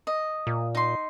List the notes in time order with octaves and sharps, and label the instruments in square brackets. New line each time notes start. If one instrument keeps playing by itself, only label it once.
[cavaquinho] D#5
[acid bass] A#2
[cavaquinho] D#4 C6